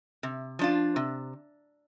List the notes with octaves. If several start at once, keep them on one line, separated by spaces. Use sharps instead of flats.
C3
F3 D4 F4
C3